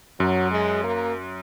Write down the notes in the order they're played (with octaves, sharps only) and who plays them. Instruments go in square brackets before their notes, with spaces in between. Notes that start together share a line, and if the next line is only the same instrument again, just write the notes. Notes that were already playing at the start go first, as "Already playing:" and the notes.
[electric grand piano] F#2 [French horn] F#3
[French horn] G#3
A#3